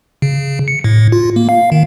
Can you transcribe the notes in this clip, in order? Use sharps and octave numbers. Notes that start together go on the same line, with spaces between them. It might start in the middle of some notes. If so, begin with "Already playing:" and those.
C#3
C#7
A2
F4
A#3
F5
D#3